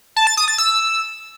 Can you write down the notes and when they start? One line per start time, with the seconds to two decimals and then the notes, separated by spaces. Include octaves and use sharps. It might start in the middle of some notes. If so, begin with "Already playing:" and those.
0.16 A5
0.27 A6
0.37 D#6
0.48 A6
0.58 E6